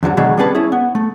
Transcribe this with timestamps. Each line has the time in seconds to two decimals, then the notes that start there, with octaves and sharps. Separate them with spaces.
0.03 E2 D3 F3 F#3
0.17 B2 D3 D#3 F#3 G#3
0.37 G3 B3 C#4 G#4 B4 A5
0.55 C#4 E4 G#4
0.72 B3
0.95 A3